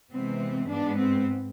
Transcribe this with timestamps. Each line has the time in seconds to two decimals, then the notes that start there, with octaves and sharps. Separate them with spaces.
0.11 C3 E3 G#3 B3 C4
0.69 G#2 G#3 B3 D4
0.98 C4